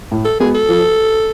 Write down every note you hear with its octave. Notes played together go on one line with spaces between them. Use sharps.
A2
A4
G#3 B3 F#4 G#4
A4
F3